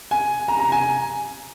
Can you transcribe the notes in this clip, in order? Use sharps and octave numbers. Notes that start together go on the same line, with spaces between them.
G#5
A#5
A#5
G#5